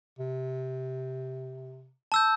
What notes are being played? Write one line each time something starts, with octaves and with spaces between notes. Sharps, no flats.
C3
A5 E6 G6